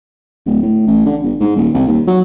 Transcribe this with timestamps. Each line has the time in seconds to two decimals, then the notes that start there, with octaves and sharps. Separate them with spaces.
0.46 D1
0.62 A2
0.87 A1
1.06 D3
1.23 G1
1.40 G#2
1.56 D#1
1.74 C2
1.87 D#2
2.07 F#3